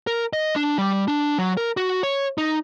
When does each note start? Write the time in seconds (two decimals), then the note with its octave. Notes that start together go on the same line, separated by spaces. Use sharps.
0.07 A#4
0.33 D#5
0.56 D4
0.78 G3
1.08 D4
1.38 F#3
1.57 A#4
1.77 F#4
2.03 C#5
2.38 D#4